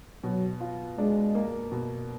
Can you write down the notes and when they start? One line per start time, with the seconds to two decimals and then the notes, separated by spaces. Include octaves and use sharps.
0.23 B2 F#3
0.60 F4
0.98 G#3 D4
1.35 A#3
1.72 B2